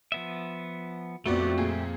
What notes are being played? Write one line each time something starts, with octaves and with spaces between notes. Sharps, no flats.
F3 B3 E5
A#1 F2 A3 B3 F#4 G4 D5
A#2 G#4